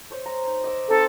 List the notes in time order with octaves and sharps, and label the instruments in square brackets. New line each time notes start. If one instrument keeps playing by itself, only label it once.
[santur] C5 C#5
A#5
D#4
D#5 D6 E6
[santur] C4 D#4 [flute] A4